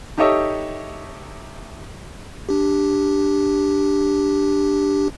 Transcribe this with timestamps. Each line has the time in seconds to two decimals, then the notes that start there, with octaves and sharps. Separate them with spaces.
0.18 D#4 G4 A4 C#5 D#5 E5
2.49 D4 G4